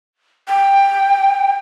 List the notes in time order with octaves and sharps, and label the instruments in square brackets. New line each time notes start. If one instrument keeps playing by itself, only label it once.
[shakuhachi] G5